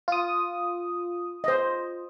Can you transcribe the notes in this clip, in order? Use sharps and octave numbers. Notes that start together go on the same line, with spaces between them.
F4 D#6
C5 D#5